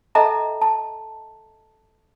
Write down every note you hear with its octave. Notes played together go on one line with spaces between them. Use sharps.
A4 D#5 E5 G5 A5 A#5
A5